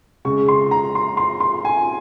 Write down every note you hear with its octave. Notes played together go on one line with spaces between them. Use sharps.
C#3 G#3 C#6
C6
A#5
C6
C6
C6
G#5